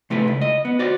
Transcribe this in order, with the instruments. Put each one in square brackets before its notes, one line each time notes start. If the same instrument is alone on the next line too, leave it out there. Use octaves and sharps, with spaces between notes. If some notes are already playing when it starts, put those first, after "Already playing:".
[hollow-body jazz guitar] C3 A3 E4 B4
C#2
D#5
B3
F#4 C5 D5